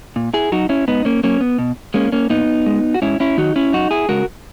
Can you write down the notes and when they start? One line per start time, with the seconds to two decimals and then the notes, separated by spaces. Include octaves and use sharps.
0.16 A#2
0.34 E4 G#4
0.52 F#3 D#4 F#4
0.69 C#4 E4
0.88 G#2 B3 D#4
1.05 A#3 C#4
1.24 F#3 A#3 C#4
1.40 B3
1.58 B2
1.94 G#3 A#3 C#4
2.12 A#3 C#4
2.30 A#2 B3 D#4
2.66 G#3
2.94 F#4
3.02 G#2 C#4 E4
3.20 C#4 E4
3.38 D#3 F#3 D#4 F#4
3.56 C#4 E4
3.73 F#2 D#4 F#4
3.91 E4 G#4
4.09 C#3 G#3 F#4 A#4